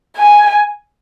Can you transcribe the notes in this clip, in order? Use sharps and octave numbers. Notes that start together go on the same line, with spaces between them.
G#5